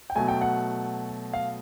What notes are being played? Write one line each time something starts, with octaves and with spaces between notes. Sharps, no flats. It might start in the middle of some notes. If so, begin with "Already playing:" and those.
G5
B2 F#3 A3 G#5
G5
F#5
F5